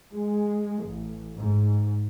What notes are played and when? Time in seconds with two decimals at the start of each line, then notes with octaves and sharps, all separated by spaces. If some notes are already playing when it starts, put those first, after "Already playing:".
0.15 G#3
0.86 A1
1.35 G#2